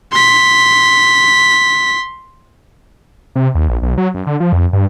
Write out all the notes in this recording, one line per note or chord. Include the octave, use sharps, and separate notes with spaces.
C6 B6
C3
D#2
A#1
B1
F#3
F#2
D3
F3
F2
G2